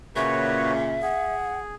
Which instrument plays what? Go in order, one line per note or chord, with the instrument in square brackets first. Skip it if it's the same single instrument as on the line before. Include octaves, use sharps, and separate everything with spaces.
[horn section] A#2 C#3 [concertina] F#4 B4 C#5 [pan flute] E5
[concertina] G#4 [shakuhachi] F#5